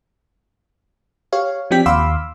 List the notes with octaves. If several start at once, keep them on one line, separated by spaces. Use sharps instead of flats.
G4 C#5 F5
F3 C4 D4 G4 G5 B6
D#2 F5 B5 C6 D6 E6